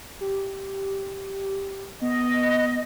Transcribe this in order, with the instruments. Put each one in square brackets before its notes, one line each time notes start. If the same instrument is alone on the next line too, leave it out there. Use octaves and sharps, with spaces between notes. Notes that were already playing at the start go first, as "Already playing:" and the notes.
[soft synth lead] G4
[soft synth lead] B3 [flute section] D#5